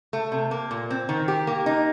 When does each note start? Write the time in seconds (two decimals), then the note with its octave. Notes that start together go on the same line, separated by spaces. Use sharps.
0.13 A3
0.32 C3
0.51 A#3
0.71 A#2
0.90 C4
1.09 D#3
1.28 G4
1.47 A#3
1.66 D#4